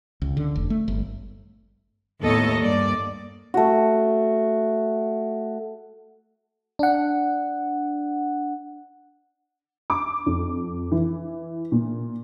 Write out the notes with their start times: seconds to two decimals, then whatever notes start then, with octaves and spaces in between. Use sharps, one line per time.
0.22 C#2
0.37 D3
0.56 F1
0.70 A3
0.88 G1
2.21 D#2 A2 B3 A4 C#5 D#5
2.59 G2 A#3 D5
3.54 A3 F#4
6.79 D4 F#5
9.90 D6
10.26 F2
10.92 E3
11.72 A#2